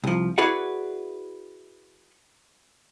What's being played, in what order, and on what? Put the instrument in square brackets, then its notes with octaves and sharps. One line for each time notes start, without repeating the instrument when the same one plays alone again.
[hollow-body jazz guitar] C2 F3
E4 F#4 G#4 B4 D5 F#5